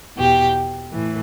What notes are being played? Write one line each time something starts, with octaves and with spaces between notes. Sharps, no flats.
E2 B2 G4
A2 E3